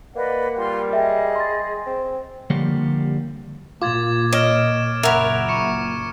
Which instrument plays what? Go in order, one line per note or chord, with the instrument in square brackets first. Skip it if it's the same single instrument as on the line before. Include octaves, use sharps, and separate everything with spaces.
[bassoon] A#3 [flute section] B4 D5 D#5 [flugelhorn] F#5
[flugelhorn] G3 [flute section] F4 G5 C6
[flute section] G#4 D#5 [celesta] E5 G5
[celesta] C6 A6
[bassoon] C4
[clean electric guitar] D3 F3 G3 A#3 G4 C#5
[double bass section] A#2 [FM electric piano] F4 [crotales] D6 G#6 A6
[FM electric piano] C#5 [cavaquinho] D#5 [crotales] F6 D7 E7
[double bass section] F#1 A#2 [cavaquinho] A#4 C#5 [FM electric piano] E5 F#5 B5
[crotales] C#6 C#7 E7